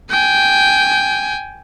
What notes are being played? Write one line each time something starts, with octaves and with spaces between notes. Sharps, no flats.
G5 G#5